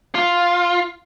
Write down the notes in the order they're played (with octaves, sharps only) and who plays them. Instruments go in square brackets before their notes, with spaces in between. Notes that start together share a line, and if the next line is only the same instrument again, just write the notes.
[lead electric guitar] F4